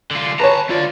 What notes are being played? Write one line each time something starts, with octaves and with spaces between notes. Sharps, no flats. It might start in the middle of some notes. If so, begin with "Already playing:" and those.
D3 F4
B4 C#5 A5 A#5
A3 F4 D5